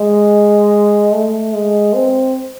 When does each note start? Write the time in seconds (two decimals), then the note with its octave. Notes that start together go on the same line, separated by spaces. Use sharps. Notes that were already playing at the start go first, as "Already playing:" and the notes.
Already playing: G#3
1.12 A3
1.53 G#3
1.93 C4